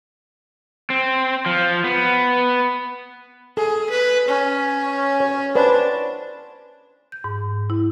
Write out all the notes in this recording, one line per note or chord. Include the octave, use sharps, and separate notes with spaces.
C4
F3
B3
G#4 A4
B4
C#4
C#5
D4 B4 C5 D5
G6
G#2
E4